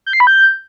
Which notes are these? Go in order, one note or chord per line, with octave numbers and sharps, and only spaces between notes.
G6
C7
B5
G6